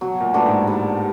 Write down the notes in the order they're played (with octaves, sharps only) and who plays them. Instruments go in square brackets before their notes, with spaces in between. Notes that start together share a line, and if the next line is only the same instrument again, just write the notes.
[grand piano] B2 [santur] F#3
[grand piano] A#2
[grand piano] A2 [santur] B3 D4 F#4
[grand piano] G#2
[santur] G3